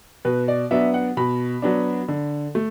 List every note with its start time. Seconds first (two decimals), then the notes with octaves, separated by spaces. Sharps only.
0.25 B2 B4
0.48 D5
0.71 F#3 B3 D4 E5
0.94 F#5
1.17 B2 B5
1.62 F#3 B3 D4
2.08 D3
2.55 A3